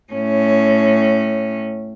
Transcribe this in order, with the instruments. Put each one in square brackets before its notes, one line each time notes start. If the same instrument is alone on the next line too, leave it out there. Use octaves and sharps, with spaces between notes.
[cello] A2 C#4